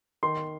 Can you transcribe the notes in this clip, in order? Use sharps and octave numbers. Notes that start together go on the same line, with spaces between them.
D#3 C6